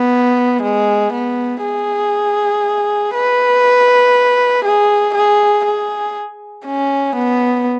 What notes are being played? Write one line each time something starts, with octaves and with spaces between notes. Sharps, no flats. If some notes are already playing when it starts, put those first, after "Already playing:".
Already playing: B3
G#3
B3
G#4
B4
G#4
G#4
G#4
C#4
B3